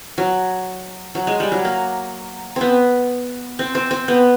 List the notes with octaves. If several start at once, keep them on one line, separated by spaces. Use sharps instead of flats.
F#3
F#3
G#3
G3
F#3
A#3
B3 C4
C4
C4
C4
B3